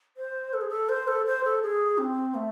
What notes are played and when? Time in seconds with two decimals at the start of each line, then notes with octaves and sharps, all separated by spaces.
0.17 C5
0.53 A4
0.61 G#4
0.69 A4
0.89 C5
1.08 A4
1.26 C5
1.44 A4
1.62 G#4
1.98 C4
2.35 A3